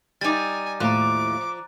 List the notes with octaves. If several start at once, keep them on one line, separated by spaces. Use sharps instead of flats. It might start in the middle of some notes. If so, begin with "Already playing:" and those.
G3 D#4 G#5 D6 A6
D#2 A2 F3 A#5 D6 F#6